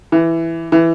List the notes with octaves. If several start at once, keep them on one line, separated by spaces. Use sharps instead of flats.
E3
E3